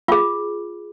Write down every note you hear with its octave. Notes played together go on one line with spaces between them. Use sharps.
F4 G#4